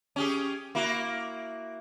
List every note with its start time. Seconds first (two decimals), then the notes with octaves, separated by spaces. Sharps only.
0.16 C#4 G4 G#4
0.75 A#3 E4 F#4